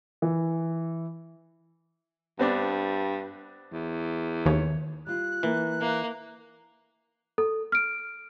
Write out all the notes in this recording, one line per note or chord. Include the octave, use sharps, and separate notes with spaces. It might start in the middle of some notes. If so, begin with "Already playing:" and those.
E3
G2 B3 C4 D4
E2
D#2 C#5
G3 F4 F#6
E3 A#3
A#3 E5
A4
F6 D7